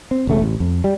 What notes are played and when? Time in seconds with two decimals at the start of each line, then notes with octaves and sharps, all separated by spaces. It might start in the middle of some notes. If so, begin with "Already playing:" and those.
0.11 C4
0.27 E1 C#3 A3
0.42 A1
0.60 F2
0.84 G3